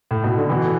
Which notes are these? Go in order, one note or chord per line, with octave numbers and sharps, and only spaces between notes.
A2
B2
D3
B2 E3